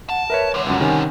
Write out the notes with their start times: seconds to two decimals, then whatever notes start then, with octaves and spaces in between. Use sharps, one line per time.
0.09 F#5 A5
0.30 A#4 B4 C#5 E5
0.54 G2 D3 C#5
0.66 C#2 F#2 F#5
0.81 C3 D#3 C#4 G#5